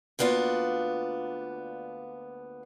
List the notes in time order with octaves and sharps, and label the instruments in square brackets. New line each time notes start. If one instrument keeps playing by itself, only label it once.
[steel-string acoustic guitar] D2 A#3 B3 D4 F4